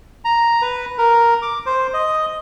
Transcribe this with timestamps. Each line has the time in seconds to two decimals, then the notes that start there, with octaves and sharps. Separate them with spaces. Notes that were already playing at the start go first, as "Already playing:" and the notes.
0.25 A#5
0.62 B4
0.98 A#4
1.42 D6
1.66 C5
1.94 D#5